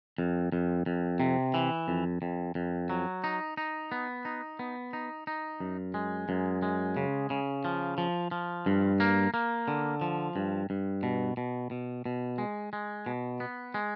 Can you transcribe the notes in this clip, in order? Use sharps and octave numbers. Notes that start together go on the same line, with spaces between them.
F2
F2
F2
C3
E3
F2
F2
F2
F#3
D#4
D#4
B3
D#4
B3
D#4
D#4
F#2
G#3
F#2
G#3
C#3
C#3
F3
F3
F3
G2
A#3
A#3
D3
F3
G2
G2
B2
B2
B2
B2
G#3
G#3
B2
B3
G#3